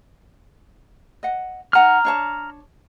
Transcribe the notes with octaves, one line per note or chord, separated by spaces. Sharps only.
D#5 F#5
D#4 F#5 G#5 A#5 F6
D4 C#5 A5